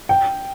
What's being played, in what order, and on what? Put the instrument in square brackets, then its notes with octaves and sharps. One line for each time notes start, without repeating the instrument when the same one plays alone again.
[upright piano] G5